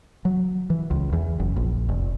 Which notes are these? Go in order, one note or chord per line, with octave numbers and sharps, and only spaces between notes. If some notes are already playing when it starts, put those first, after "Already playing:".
F#3
E3
C#2
E2
F#1
A#1
F1